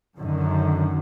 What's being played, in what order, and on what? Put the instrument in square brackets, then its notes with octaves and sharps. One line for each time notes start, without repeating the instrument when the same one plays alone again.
[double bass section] F#2 D3 D#3